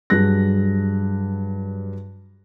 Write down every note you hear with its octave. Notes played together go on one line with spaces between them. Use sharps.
G2 F#3 G#4 F#6 A#6